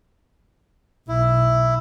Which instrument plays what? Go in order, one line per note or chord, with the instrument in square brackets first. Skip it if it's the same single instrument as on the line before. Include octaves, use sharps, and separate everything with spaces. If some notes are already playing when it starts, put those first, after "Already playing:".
[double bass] B1 [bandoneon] E4